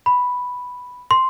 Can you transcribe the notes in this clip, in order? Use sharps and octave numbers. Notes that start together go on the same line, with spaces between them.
B5
C6